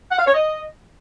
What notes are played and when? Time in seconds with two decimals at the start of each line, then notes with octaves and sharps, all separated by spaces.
0.11 F#5
0.19 F5
0.26 C#5
0.34 D#5